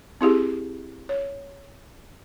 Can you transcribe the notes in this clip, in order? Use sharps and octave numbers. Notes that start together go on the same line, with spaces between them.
C4 E4 G4 G#4
C#5